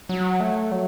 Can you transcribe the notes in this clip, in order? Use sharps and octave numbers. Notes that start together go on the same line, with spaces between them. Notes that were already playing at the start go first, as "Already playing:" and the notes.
F#3
A3
F#3